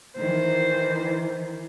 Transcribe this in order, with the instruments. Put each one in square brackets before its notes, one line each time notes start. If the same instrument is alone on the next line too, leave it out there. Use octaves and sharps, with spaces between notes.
[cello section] D#3 E3 [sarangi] C5